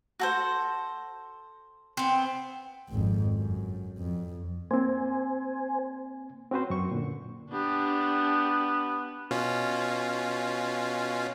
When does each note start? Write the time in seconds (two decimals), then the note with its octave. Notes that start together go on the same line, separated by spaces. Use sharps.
0.19 F#4 A4 C5
1.97 B3 C4
2.90 G#1 F2
3.34 F#2
3.98 F2
4.71 A#3 C4 C5 G#5
6.51 C4 C#4 F#4 B4 C5
6.70 F#2 C#6
6.91 A#2 D3
7.50 B3 D4 G4
9.31 B2 C#4 F4